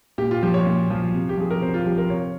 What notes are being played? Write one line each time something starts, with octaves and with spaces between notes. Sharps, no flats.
A#2 G4
F4
F3 G4
C#5
A#2
F3
C3
G4
F3 G#4
A#4
C3 C5
F4
F3 G4
A#4
C3 C#5